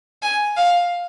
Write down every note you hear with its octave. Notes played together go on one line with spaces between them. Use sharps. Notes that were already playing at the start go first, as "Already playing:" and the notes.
G#5
F5